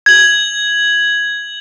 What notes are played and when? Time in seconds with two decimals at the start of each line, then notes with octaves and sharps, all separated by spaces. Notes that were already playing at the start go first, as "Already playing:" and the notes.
0.06 G#6 F#7